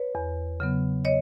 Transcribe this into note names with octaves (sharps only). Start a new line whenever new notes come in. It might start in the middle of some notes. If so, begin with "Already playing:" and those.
Already playing: B4 C#5
E2
C#3 F#3 B3
C#5 D#5